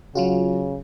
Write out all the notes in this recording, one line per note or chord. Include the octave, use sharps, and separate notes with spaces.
C#3 F#3 F4 F#4